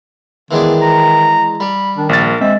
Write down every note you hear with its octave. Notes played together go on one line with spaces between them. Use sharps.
D#3 E3 G#3 B3 D4
A#5
G3 B5
D#3 D4
A#1 A#4 A6
G#3 C4 E5